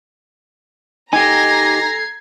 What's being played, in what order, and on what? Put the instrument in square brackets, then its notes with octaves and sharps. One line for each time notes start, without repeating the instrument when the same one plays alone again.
[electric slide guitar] D#4 G4 [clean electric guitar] A4 G#5 [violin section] A#5 A#6 [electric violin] G#6 C7